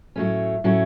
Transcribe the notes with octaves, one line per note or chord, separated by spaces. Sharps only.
A2 F#3 A3 C#4
A2 F#3 A3 C#4